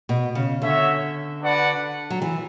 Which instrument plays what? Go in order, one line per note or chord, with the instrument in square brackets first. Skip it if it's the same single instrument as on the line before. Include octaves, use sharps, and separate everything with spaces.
[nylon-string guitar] B2
C#3
[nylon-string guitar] D3 [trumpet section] C#4 F#4 C#5 E5
[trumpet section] D4 F#4 B4 D5 F#5
[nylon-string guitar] F#3
E3